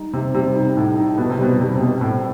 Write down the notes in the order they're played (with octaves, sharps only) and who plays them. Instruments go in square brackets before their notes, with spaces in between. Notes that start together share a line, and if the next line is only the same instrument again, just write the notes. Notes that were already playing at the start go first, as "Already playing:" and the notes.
Already playing: [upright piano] G3 D#4
[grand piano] C3 [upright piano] D#4
[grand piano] C3 [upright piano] G3
[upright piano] D#4
[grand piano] A2 [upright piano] D#4
[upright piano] D#4
[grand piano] B2 [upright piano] D#4
[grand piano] C3
[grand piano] B2 [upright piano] G3
[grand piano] C3 [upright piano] G3
[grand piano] C3
[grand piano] B2 [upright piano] C4
[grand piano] A2 [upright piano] C4